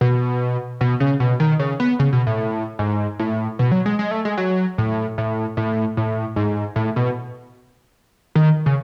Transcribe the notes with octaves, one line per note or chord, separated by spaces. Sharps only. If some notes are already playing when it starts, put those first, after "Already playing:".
B2
B2
C#3
B2
D#3
C#3
B3
C#3
B2
A2
G#2
A2
B2
F#3
G#3
G#3
A3
G#3
F#3
A2
A2
A2
A2
G#2
A2
B2
D#3
C#3